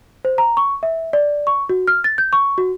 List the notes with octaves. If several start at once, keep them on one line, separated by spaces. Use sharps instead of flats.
C5
A#5
C#6
E5
D5
C#6
F#4
F6
A6
G6
C#6
F#4